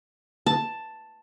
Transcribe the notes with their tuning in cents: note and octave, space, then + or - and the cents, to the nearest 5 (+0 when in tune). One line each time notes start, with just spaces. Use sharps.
A5 +5